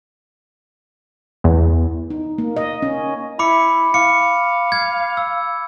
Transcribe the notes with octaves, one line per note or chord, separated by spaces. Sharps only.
E2
D#4
A#3
D#5
C#4
E4 B5 D6 C#7
F5 D6 C#7
G#6
E6